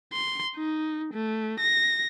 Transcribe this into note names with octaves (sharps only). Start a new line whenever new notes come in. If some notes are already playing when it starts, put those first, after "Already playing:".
C6
D#4
A3
A#6